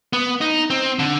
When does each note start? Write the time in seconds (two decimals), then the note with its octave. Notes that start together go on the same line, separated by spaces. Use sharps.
0.13 B3
0.41 D#4
0.70 C4
0.99 D3